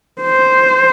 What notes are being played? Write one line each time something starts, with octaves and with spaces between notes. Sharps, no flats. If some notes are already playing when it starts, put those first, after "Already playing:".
C5